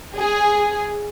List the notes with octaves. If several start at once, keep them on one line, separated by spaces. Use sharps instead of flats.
G#4